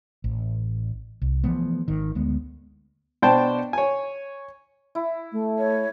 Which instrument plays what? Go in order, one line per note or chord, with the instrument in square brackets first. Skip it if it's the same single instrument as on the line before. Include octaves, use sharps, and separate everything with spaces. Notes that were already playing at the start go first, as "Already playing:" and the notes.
[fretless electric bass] A1
C2
E3 F3 A3 B3
G#1 D#3
D2 G#3 B3
[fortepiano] B2 D4 C5 G5 A5
C#5 G#5
[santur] E4
[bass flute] A3
[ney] C#5